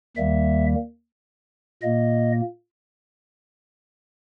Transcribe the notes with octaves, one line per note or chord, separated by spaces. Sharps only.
D#2 D#3 G3 A#3 E5
A#2 A#3 D#5